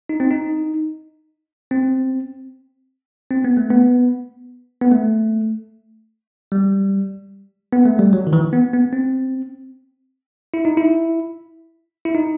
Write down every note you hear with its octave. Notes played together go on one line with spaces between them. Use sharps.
D#4
C4
D#4
C4
C4
B3
A3
B3
B3
A3
G3
B3
A3
G3
F#3
D#3
E3
B3
B3
C4
E4
D#4
E4
E4
D#4